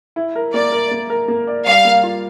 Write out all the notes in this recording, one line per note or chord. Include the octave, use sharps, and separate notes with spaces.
E4
A#4
A#3 D5
A#4
A#3
A#4
A#3
D5
G3 F5
A#3
F4